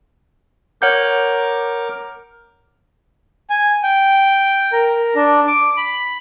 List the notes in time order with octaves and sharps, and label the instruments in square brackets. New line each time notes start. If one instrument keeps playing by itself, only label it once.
[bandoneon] A#4 D6 F6 [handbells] C#5 F#5 G6
[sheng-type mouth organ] G#5
G5
A#4
D4
D6
B5